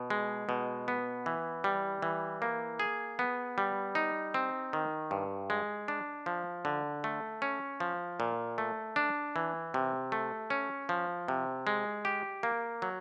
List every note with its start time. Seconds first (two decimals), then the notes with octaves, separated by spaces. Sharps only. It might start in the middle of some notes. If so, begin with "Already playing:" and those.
Already playing: B2
0.10 G#3
0.49 B2
0.88 B3
1.26 E3
1.64 G3
2.02 E3
2.42 A#3
2.80 G#4
3.19 B3
3.58 G3
3.95 D#4
4.34 C4
4.73 D#3
5.11 G2
5.50 G#3
5.88 D4
6.26 F3
6.65 D3
7.04 A3
7.42 C#4
7.80 F3
8.20 A#2
8.58 A3
8.96 D4
9.36 E3
9.74 C3
10.12 A3
10.50 C#4
10.89 F3
11.28 C3
11.67 G#3
12.05 G4
12.43 A#3
12.82 F#3